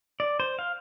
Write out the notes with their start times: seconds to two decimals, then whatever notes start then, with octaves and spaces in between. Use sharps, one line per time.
0.20 D5
0.40 C5
0.59 F5